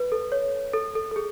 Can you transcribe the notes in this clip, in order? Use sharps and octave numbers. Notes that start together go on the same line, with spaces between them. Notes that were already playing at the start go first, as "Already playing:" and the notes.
Already playing: B4
A4
C#5
A4
A4
A4
G#4